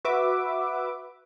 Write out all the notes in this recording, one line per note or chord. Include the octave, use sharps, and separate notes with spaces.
F#4 B4 E5 D6